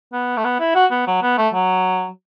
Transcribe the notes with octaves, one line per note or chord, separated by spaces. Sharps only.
B3
A3
B3
E4
F#4
B3
F#3
B3
A3
F#3